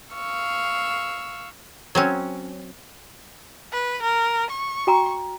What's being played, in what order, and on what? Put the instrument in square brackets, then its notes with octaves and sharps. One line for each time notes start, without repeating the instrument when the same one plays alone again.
[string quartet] F5 C#6 E6
[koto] F#3 C4 C#4
[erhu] B4
A#4
C#6
[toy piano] F#4 G5 A#5